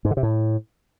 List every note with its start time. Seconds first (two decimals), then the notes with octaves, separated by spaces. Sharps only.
0.05 G#2
0.11 D3
0.17 C3
0.23 A2